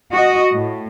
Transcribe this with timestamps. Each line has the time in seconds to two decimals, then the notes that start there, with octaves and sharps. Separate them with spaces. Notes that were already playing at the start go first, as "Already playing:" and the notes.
0.13 F#4 D#5
0.54 A2